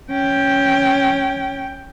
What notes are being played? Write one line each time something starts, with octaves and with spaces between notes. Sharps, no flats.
C#4 G5